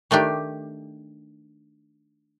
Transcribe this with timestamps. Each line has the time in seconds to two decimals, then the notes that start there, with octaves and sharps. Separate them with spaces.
0.11 D#3 A3 D4 G4